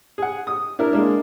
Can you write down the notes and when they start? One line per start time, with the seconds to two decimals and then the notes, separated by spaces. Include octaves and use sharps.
0.18 G#4 F#5
0.47 D#6
0.79 D4 E4 A#4
0.93 G#3 A#3 D4